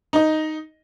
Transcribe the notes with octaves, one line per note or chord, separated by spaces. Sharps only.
D#4 D#5